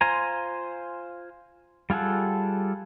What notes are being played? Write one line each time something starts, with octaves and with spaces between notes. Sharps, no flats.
F4 C5 G#5 A#5
G3 F4 G#4 A4 F#5